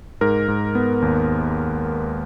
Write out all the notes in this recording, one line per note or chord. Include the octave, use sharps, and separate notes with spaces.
G#2 A#4
G#2
B3
D#2